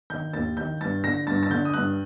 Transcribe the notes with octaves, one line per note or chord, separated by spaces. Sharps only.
D#3 G6
D#2 A6
D#3 G6
G2 A6
D3 A#6
G2 A6
A6
D3 G6
D#6
G2 F#6